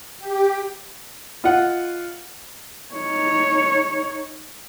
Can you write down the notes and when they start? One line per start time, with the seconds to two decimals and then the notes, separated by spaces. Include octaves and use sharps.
0.19 G4
1.44 F4 D#5 F#5
2.95 D#4 C#5